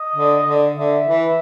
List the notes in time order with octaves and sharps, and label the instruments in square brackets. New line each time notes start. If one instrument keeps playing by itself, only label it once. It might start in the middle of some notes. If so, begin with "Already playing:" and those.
Already playing: [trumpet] D#5
[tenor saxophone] D3
D3
[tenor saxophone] D3 [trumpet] E5
[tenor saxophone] E3